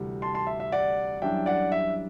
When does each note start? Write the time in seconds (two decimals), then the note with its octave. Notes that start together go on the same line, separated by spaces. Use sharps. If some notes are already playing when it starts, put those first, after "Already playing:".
Already playing: D2 C3 E3 G3
0.22 A5 C6
0.34 A5 C6
0.47 E5
0.60 E5
0.72 D5 F#5
1.22 F#2 E3 G3 D4 E5 G5
1.46 D5 F#5
1.72 E5